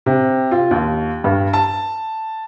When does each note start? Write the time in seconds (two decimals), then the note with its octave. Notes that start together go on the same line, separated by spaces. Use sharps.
0.06 C3
0.51 F4
0.71 D#2
1.24 G2
1.53 A5